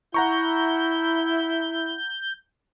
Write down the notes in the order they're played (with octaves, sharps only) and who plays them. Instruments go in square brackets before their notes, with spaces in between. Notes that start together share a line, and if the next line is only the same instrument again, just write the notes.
[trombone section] E4 [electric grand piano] F#5 A#5 C#6 [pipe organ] G6